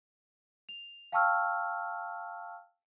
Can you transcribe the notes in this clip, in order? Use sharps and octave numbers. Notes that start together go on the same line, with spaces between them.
F7
F5 G5 A5 C#6 E6 F6